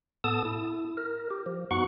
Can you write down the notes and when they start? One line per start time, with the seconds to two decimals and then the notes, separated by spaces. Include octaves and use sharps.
0.24 A2 B3 A4 A5 D#6
0.45 E4
0.97 A#4
1.30 G4
1.46 F3
1.71 F#2 B3 D#4 F#4 F#5 C#6